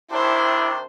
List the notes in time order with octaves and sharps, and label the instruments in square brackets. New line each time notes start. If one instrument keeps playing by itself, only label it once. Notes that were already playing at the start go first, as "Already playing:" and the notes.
[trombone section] C3 D#3 D4 [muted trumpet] E4 [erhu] C5